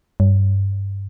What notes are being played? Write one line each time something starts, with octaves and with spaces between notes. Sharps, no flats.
G2